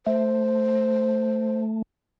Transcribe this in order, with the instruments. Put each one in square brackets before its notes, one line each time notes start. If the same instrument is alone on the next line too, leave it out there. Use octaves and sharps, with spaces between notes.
[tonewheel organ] A3 [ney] C5